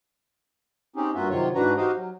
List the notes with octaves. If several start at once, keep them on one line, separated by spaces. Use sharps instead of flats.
C4 C#4 D#4 G4 G#4
G2 A#3 F4 F#4 E5
C3 D#3 F#3 F4 C#5
G#2 E3 D4 F#4 B4 A#5
D#4 F#4 G4 C5 D#5 F5
F#3